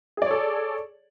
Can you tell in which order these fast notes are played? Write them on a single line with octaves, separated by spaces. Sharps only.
G#4 D5 C#5 A4